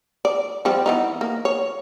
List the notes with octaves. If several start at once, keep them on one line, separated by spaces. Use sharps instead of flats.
D5
F3 G3 C4
E3 B3 D#4
A#3
C#5